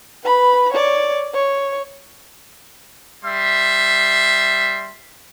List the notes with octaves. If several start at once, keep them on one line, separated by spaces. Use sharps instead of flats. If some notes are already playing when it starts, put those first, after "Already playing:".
B4 B5
C#5 D5
C#5
G3 E5 C6